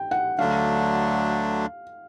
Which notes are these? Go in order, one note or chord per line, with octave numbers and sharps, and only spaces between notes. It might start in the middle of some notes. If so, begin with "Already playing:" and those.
Already playing: G5
F#5
D2 D3 F#3 A3 D4 F5